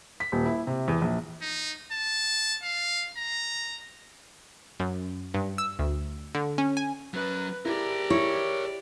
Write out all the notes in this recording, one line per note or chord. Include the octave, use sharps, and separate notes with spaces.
B6
D#1
E4
C3
E2
A#1
D#4
A5
F5
A#5
F#2
G2
E6
D2
D3
C#4
G#5
F#3 C#4 B4
E4 G4 G#4 A#4 D5
E4 C#5